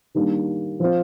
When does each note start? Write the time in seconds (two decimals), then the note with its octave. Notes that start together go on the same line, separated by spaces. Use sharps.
0.15 D#3 G3 A#3 D4
0.80 F3 C4 F4